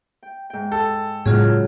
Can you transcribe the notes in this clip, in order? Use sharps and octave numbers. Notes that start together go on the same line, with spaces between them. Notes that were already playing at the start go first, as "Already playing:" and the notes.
G5
G#2 G5
A4
A2 C#3 F#3 G#3 B3 F4 G#4